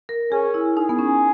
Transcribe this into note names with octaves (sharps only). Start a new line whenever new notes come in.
A#4
C#4 G#4
E4
D#4 G#4
B3
C#4